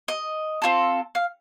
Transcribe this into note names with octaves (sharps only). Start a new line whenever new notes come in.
D#5
C4 F4 A4
F5